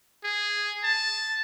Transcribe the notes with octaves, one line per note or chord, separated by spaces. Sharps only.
G#4
A5